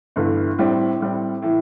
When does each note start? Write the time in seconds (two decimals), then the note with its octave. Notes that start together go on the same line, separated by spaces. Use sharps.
0.16 G1 G2 E3 A3
0.58 A2 G3 C4
1.00 A2 G3 C4
1.42 A2 E3